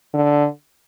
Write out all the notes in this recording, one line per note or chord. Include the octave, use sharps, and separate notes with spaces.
D3